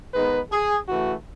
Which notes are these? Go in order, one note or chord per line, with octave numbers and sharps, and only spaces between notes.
G#2 D#3 G#3 B3 D#4 B4
G#4
C#3 E3 A3 F#4